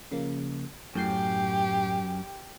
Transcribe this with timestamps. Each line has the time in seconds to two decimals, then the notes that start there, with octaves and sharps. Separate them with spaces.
0.12 C#3 F3 A#3
0.95 F#2 A2 G4 G6 C7